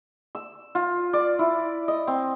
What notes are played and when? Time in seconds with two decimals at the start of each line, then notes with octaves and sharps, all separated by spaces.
0.35 E6
0.75 F4
1.13 D5
1.39 E4
1.88 D#5
2.07 C4